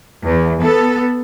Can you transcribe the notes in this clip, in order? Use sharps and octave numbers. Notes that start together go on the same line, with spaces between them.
E2
B3 A4